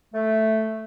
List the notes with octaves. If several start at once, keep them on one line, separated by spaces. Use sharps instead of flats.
A3